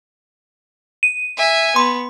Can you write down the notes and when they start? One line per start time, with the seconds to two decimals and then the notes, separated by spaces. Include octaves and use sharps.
1.03 D#7
1.38 E5 G#5
1.76 B3 C6